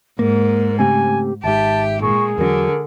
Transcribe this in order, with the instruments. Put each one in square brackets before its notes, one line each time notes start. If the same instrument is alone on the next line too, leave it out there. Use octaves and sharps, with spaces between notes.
[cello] G#2 [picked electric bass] A#3 [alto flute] A#4
[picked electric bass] C#3 A3 C4 [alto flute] G4 [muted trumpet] G#5
[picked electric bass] G#1 G#2 [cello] G4 [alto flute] E5 [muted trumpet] A5
[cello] A#2 G#3 [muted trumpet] G#4 [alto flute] C#6
[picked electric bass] E2 F#3 [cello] D3 [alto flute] A#4